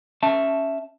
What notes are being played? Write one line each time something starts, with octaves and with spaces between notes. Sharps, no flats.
C#4 E5 A5